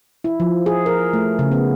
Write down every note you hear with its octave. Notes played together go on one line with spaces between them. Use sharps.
E4
F3
G#4
A#4
A3
C#3
B3